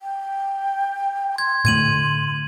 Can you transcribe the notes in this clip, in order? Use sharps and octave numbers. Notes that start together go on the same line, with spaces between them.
G5
C6 G#6
A2 D3 A3 G#6 D#7 F#7